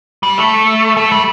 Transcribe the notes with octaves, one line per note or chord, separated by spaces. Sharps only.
G3
A3
A3
G3